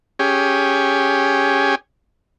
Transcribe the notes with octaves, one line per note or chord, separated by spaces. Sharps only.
C#4 G4 G#4